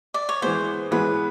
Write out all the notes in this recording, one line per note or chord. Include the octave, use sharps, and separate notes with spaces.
D5
C#5
E3 G#3 B3 C5
E3 G#3 B3 B4